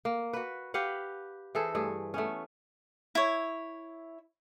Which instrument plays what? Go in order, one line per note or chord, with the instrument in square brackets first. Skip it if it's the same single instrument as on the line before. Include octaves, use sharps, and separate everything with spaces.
[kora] A#3
F#4 B4
G4 B4 F5 F#5
E3 G#4 A4 C5
G2 A3 G#4
A3 B3 C#4
[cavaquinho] E4 C#5